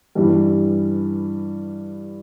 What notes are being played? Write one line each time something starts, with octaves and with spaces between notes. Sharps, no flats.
G2 E3 G3